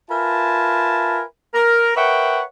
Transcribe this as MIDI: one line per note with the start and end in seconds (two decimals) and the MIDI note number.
0.10 1.22 65
0.10 1.22 70
0.10 1.22 71
0.10 1.22 76
0.10 1.22 80
0.10 1.22 81
1.55 1.93 70
1.96 2.42 70
1.96 2.42 71
1.96 2.42 73
1.96 2.42 76
1.96 2.42 78
1.96 2.42 79